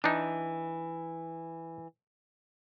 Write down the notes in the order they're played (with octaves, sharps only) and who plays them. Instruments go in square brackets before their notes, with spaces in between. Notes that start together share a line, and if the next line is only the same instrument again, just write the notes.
[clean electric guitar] E3 [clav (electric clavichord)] D4 D#4